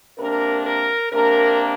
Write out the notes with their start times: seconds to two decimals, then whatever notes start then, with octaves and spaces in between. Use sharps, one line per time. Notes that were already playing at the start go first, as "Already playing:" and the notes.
0.18 C3 A#3 D4 A#4
0.66 A#4
1.13 C3 A#3 D4 A#4